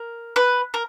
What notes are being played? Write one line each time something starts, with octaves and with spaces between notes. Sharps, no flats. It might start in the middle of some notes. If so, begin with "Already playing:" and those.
Already playing: A#4
B4
A#4